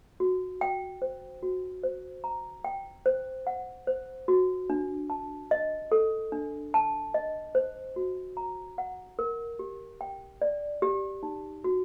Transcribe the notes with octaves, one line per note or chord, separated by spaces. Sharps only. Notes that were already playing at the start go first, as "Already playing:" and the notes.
F#4
G5
C5
F#4
C5
A#5
G5
C5
F#5
C5
F#4
D4
A5
D#5
A4
D4
A5
D#5
C5
F#4
A#5
F#5
A#4
G4
G5
D5
G4
D#4
F#4